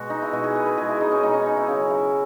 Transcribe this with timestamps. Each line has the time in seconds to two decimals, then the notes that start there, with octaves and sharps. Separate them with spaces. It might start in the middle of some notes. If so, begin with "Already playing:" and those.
Already playing: B2 G#3 F#4
0.10 D#4
0.22 E4
0.33 B2 G#3 F#4
0.44 G#4
0.56 B4
0.66 B4
0.77 B2 G#3 G#4
0.89 E4
1.01 D#4
1.11 C#4
1.23 B2 G#3 D#4
1.34 C#4
1.46 D#4
1.57 E4
1.68 C#3 F#3
1.90 E4